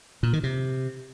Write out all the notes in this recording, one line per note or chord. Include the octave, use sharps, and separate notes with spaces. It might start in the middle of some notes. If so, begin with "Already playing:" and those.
A#2
D#3
C3